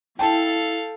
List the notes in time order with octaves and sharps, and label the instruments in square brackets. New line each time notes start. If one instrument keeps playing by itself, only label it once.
[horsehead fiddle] E4 [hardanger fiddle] A4 F5 [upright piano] G5 A5